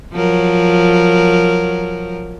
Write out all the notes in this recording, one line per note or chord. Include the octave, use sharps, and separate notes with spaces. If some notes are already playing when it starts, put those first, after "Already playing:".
F3 F#3 A#4